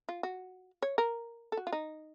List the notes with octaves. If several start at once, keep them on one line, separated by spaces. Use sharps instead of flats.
F4
F#4
C#5
A#4
A4
F#4
F4
D#4